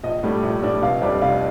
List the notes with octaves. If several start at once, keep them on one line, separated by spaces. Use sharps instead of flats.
A#1 D#5
A2 G3 D4
A#1
A2 G3 D4
F1 F5
F2 C3 G3 D4
F1 F5